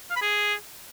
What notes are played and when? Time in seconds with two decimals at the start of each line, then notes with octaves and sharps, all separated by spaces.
0.10 F5
0.16 B5
0.22 G#4